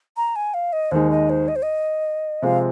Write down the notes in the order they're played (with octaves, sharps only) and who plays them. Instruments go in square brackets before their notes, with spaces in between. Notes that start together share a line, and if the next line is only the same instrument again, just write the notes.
[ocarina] A#5
G#5
F5
D#5
[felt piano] D#2 D#3 G#3 D#4 [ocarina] C5
[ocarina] D#5
C5
D#5
C5
D#5
[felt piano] C3 F3 G#3 C4 [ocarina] F5